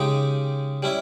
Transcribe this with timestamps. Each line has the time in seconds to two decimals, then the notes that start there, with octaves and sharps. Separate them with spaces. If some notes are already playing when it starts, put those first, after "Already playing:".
Already playing: C#3 G#3 D#4 G4
0.83 G3 C#4 E4